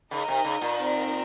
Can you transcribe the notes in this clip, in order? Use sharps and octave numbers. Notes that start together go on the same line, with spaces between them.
C#3 D#4 A#4 D#5
C3
C#3
A#2
C4 D#4 A#4